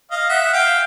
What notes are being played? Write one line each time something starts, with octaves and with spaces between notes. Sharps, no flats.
D#5 F5
E5 F#5
F#5
F5 G5